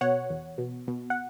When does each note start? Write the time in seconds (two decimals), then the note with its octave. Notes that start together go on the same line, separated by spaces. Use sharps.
0.01 B2 C#5 F#5
0.30 E2
0.58 B2
0.88 B2
1.10 F#5